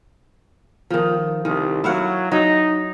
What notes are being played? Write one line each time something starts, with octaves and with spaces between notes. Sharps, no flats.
D#3 F3
C2 D#3
F#3 E4 F5 F#5
F#3 D#4